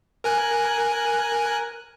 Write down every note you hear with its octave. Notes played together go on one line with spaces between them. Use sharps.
A#4 G#5 F#6